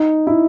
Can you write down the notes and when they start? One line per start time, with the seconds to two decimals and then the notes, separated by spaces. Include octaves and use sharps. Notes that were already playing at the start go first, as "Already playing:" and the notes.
Already playing: D#4
0.27 E4